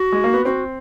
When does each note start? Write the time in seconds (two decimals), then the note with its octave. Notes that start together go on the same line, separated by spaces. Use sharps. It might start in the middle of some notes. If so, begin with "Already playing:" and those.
Already playing: F#4
0.12 G#3
0.24 A#3
0.34 B3
0.45 C4 F#4